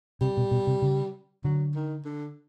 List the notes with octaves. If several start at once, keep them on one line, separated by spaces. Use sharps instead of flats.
C3 G3
B2
B2
C3
C#3
D3 F#3
D#3
D3